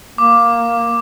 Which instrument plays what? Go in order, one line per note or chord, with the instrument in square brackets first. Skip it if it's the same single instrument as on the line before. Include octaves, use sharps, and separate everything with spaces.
[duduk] A#3 [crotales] D6